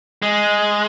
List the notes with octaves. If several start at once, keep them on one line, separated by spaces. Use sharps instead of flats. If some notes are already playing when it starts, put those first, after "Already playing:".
G#3